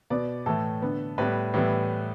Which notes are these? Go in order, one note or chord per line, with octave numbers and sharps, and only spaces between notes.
B2 B3 D5
A2 E3 A3 A4
D3 B3
A2 G3 B3 B4
A2 E3 G3 B3